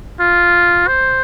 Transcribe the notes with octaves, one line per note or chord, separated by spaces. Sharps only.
F4
C5